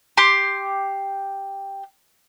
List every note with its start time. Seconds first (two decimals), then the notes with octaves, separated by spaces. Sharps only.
0.17 G4 C6